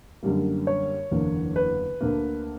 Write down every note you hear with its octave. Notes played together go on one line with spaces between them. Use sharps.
F#2 D3 G3 A#3
C#5
F#1 E2 D3 A#3
B4
D2 D3 A#3